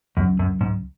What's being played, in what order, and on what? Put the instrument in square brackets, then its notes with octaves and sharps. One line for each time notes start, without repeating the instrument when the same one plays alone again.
[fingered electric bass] C#2 C#3 F#3 C#4 [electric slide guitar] F#2
[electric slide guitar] F#2
G#2